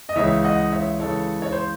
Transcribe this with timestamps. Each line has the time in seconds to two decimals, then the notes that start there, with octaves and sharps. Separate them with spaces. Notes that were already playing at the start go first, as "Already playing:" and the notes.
0.09 D#5
0.15 C#2 C#3 E3 C#5 E5
0.44 D#5 F#5
0.72 C#5 E5
1.00 C#2 C#3 E3 A4 C#5
1.42 C#5
1.52 C5